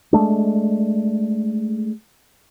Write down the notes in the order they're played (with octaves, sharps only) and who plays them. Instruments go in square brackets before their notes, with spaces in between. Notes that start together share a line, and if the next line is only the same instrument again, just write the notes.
[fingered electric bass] G#3 A3 D4